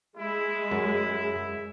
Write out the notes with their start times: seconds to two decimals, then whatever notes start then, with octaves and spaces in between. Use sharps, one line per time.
0.17 G#3 E4
0.71 F#2